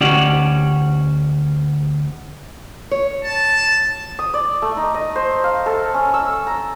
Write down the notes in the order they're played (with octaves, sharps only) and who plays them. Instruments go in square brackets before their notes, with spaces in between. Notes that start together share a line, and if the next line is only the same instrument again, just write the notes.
[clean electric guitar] D2 C#4 D#4 F#4 G4 D5
[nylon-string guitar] C#5
[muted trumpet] A5
[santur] D#6
D5
A3
D#4
D#5
C5
F5
A4
C#4
E6
A#5